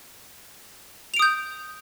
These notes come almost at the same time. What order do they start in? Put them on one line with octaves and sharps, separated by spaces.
F7 D7 D#6 G6